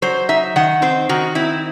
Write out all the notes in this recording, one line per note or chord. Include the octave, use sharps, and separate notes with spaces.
F#3 C5
D#4 E5
D#3 F#5
C4 C5
D#3 F#4
C4 E4